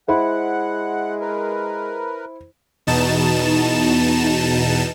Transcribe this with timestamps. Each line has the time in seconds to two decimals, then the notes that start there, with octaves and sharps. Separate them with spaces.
0.08 G#3 E4 C5 F#5
1.21 A#4 B4
2.87 E2 B2 D#4 A5 E7